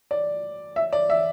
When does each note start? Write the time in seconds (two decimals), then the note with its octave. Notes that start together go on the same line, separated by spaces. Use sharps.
0.11 D5
0.76 E5
0.93 D5
1.10 E5